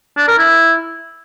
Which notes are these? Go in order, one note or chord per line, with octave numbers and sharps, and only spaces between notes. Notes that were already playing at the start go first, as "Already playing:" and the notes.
D4
A#4
E4